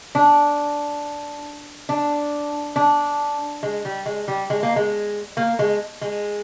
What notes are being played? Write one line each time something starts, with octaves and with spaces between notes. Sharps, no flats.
D4
D4
D4
G#3
G3
G#3
G3
G#3
A#3
G#3
A#3
G#3
G#3